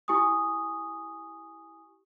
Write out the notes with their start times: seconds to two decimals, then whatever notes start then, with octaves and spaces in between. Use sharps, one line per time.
0.08 E4 G4 G#5 C#6 D#6